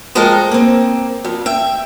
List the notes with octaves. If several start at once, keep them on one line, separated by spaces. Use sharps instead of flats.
F3 G#3 A4 A#4 D#5 G5
A#3 C4
F2
E5 G5